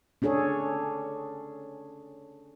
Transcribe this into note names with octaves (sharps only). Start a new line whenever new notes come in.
C#4 D4 G#4 A4 C#5